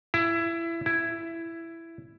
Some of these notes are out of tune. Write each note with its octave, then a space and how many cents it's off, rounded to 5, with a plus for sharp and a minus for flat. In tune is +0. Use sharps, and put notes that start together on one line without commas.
E4 +20
E4 +10